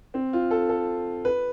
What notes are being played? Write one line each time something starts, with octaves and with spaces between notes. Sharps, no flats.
C4
F4
A4
A4
B4